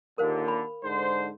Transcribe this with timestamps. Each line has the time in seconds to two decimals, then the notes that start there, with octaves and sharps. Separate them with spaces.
0.18 D#2 A#2 D3 A#4 C5 F5
0.48 B5
0.83 G#2 D3 C5